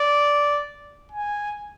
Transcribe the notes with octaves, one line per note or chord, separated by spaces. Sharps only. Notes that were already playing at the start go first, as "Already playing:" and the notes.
Already playing: D5
G#5